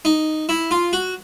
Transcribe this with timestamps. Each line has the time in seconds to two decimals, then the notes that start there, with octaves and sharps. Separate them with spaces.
0.05 D#4
0.49 E4
0.71 F4
0.93 F#4